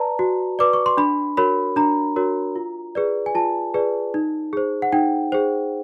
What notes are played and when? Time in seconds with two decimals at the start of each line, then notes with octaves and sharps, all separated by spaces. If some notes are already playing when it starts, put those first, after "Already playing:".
Already playing: B4 D5 A5 A#5
0.19 F#4
0.59 B4 D5 D6
0.73 C#6
0.86 C6
0.97 D4 B5
1.37 F#4 A#4 C#5 B5
1.76 D4 A#5
2.16 F#4 A#4 C#5
2.56 F4
2.95 G#4 B4 D5
3.26 G#5
3.35 F4 A5
3.74 G#4 B4 D5
4.14 D#4
4.53 G#4 C5
4.82 F#5
4.92 D#4 G5
5.32 G#4 C5